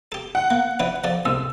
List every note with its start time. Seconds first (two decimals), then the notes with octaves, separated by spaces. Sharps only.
0.12 G4 A4
0.35 F#5
0.50 A#3
0.80 E3 D4 B4
1.04 F3 A4 D5
1.25 C2 G#2 E6